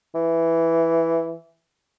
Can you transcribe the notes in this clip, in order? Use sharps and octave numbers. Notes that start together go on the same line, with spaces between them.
E3